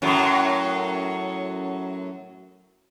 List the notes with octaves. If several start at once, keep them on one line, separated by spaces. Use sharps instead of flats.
F#2 A2 F#3